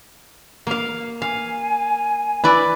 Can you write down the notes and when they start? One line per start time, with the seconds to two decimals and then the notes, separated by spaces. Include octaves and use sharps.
0.67 A#3 F5
1.22 F5 G#5
2.44 E4 B4 D5